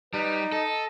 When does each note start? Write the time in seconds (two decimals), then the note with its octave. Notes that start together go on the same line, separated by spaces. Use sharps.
0.14 G3 D#4 B4
0.52 A4 D#5